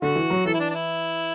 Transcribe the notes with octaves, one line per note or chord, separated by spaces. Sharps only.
D3 F#4
E3
F#3
E3 A4
E4
D4
D4
E4